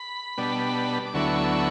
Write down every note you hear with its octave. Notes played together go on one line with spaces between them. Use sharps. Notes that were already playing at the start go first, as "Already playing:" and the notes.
Already playing: B5
B2 G3 B3 D4
D6
D2 D3 F#3 B3 E4 C#6
C#6